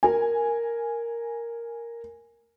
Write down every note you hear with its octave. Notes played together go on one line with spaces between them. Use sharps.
A#4 G#5